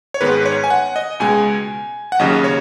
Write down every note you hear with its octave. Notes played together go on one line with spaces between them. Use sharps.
C#5
G#2 D#3 G#3 B3 B4
C#5
G#5
F#5
D#5
C#2 B2 G#3 G#5
F#5
D#2 C#3 F#3 C#4 D#5
C#5